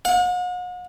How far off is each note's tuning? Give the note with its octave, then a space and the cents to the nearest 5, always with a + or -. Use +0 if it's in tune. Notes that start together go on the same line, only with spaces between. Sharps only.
F#5 -45